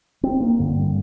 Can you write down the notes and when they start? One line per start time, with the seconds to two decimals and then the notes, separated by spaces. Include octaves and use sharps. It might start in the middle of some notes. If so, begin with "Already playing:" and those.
0.23 C4
0.41 A#3
0.59 G2 D3
0.77 G3